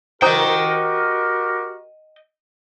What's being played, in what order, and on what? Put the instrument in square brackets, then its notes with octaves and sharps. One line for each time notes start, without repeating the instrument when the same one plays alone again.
[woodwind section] F#4 G4 A#4 [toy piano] C5 A#5 D#6 [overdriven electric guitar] D#5 G5